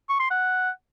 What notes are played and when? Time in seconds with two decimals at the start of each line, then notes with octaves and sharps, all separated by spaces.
0.09 C#6
0.20 C6
0.31 F#5